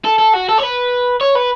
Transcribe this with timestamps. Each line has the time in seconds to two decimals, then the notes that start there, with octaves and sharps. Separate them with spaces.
0.05 A4
0.19 A4
0.34 F#4
0.49 A4
0.58 C#5
0.63 B4
1.21 C#5
1.35 B4